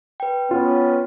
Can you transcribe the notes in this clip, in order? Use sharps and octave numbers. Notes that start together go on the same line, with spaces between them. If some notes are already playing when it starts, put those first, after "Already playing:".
B4 G5
B3 C#4 F4